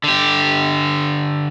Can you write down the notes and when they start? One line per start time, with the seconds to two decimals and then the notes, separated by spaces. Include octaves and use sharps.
0.04 D3 G4